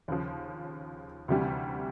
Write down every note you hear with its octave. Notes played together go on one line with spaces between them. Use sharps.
D#2 C#3 F3
D2 C3 E3 G3